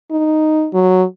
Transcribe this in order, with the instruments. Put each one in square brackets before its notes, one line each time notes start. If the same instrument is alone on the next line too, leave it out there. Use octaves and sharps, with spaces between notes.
[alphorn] D#4
F#3